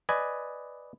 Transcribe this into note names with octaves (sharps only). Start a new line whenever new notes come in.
B4 D5 D#5 G#5